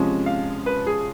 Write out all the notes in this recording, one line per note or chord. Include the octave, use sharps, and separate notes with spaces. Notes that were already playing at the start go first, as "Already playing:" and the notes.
Already playing: C3 F3 G#3 C#4
F5
B4
G#4